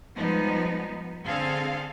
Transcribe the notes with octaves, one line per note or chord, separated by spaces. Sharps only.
F3 G3 G#3 B3 D#4
D3 C4 G#4 A4 F5